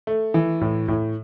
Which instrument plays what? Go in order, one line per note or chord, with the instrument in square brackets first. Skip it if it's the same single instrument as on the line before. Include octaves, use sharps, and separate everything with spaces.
[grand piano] A3
E3
A2
A2